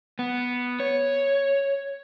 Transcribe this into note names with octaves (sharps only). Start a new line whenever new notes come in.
B3
C#5